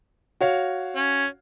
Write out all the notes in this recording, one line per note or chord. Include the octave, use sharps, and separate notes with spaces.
F#4 C#5 F5
C#4